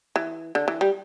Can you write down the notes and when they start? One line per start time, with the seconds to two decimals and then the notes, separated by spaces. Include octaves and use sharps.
0.16 E3
0.55 D3
0.68 E3
0.81 G3